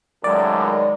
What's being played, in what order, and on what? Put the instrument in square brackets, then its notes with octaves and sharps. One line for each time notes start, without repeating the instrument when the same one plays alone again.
[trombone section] C#2 F#2 A2 [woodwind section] D#3 F#3 G#3 [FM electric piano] D5